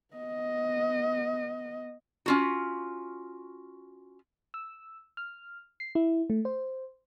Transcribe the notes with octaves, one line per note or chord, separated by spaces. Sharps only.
B3 D#5
C#4 F4 F#4
E6
F6
C7
E4
A3
C5